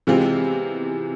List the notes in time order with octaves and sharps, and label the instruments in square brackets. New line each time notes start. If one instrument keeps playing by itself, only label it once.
[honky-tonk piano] C3 E3 G#3 C4 F4